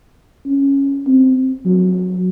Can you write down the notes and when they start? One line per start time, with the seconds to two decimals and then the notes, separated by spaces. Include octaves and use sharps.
0.47 C#4
1.06 C4
1.65 F#3